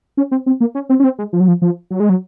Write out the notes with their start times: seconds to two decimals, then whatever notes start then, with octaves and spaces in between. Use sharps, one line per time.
0.17 C#4
0.31 C4
0.46 C4
0.61 A#3
0.75 C#4
0.89 C4
1.00 C#4
1.04 C4
1.19 G#3
1.33 F3
1.40 F#3
1.48 F3
1.62 F3
1.90 F#3
2.00 G#3
2.09 F#3